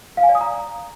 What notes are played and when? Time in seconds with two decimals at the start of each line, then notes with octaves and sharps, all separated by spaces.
0.17 F5
0.23 G#5
0.29 D5
0.35 D#6
0.41 A#5